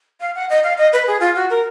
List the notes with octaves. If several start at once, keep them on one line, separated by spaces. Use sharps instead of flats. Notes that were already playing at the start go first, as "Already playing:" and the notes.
F5
F#5
D#5
F5
D#5
B4
G#4
F4
F#4
A#4